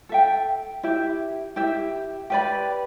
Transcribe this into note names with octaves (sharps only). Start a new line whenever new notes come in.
A4 E5 G5
E4 G4 E5
E4 G4 E5
G4 B4 D5 B5